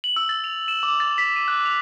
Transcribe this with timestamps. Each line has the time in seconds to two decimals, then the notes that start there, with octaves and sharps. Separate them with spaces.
0.04 F#7
0.16 E6
0.29 A6
0.44 F7
0.68 E7
0.83 D6
1.00 A6
1.18 B6
1.36 D#7
1.48 F#6
1.66 F7